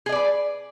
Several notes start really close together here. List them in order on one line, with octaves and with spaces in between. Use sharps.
G#4 D#5 D5 B4